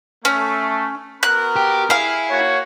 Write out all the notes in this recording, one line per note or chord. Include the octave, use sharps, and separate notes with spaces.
A3 C#4
B3 F#4 A#4 F#6
G4
E4 G#4 F5
A#3 F#4 C#5